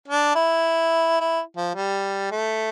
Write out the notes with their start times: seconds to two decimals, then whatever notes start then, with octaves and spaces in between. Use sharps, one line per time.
0.08 D4
0.36 E4
1.21 E4
1.57 F3
1.75 G3
2.31 A3